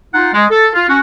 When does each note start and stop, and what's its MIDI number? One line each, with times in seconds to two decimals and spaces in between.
0.14 0.30 63
0.14 0.30 65
0.14 0.30 78
0.33 0.46 56
0.50 0.69 69
0.74 0.88 65
0.89 1.00 61
0.89 1.00 66